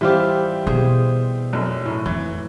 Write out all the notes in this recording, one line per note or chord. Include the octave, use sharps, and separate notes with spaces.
E3 G3 C4 F4 G4
B2 G#4 C5
F1 F#2
A2
F2 E3